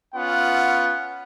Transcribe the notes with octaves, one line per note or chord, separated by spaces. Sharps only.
B3 C#4 F4 F#5